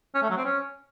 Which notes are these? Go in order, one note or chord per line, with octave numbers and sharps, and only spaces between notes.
C#4
A3
F#3
C4
C#4